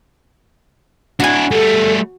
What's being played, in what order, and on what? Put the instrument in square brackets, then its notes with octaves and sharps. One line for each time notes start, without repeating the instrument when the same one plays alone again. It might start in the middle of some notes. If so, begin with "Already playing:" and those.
[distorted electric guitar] D4 E4 [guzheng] F#4 G#5
[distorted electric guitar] G3 A3 [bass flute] A4